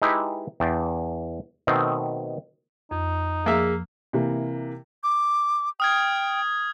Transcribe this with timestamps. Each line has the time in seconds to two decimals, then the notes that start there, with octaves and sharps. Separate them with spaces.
0.02 G#3 D#4 E4 G4 B4
0.60 E2 D4 G5 A5
1.67 B2 D#3 A3 C4
2.91 F2 D#4
3.46 F3 A#3 G#4 E5
4.13 C3 E3 A#3
5.03 D6
5.80 G5 D#6 F6 G#6